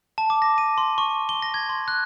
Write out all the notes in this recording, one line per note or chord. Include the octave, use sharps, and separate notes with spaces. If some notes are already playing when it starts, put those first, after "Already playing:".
A5
D6
A#6
D#7
C6
C#6
G7
A#6
G#6
C6
F#6